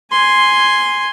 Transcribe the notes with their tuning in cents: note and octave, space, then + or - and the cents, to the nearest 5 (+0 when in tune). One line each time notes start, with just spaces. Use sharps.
G#5 -5 C6 +0